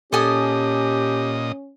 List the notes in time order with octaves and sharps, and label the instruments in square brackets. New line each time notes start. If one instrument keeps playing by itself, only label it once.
[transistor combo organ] A#2 D#5 [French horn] C#4 [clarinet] G4 [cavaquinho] A4 G#5 D#6